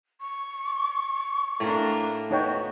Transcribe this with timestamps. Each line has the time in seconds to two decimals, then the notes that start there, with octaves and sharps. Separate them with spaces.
0.21 C#6
1.60 A2 A#3 D4
2.31 B3 D#4 F#4 C#5 G5